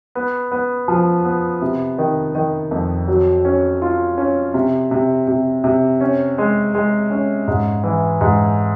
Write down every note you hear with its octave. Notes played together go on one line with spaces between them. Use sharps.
B3
B3
F3
B3
C3
D#3
D#3
F2
F#3
C#4
F4
C#4
C3
C3
C3
C3
C#4
G#3
G#3
C#4
G#2
E3
G#2